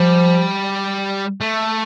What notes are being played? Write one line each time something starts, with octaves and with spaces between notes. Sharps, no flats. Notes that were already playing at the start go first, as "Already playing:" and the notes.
Already playing: F3 G3
A3